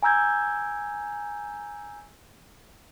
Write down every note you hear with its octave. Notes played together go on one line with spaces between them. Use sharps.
G#5 A#5 E6 G6 G#6